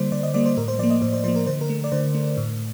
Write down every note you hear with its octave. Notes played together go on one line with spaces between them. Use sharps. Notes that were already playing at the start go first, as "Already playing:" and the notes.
Already playing: D3 G3 A#3 C5 D5
D3 D5
D#5
G3 A#3 D5
C5
A2 A#4
C5
F3 A#3 D5
D#5
A2 C5
C5
F3 A#3 C5
A#4
D3 C5
A#4
A3
D5
D3 C5
A3
A2